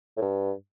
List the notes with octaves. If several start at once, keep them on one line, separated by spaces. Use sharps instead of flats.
A2
G2